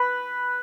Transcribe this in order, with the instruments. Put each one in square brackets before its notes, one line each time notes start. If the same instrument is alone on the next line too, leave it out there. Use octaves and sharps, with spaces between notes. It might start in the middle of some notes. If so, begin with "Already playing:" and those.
Already playing: [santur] B4